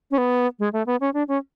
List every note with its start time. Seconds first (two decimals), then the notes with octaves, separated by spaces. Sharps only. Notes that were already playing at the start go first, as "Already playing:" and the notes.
0.11 C#4
0.18 B3
0.59 G#3
0.73 A3
0.86 B3
1.00 C#4
1.14 D4
1.28 C#4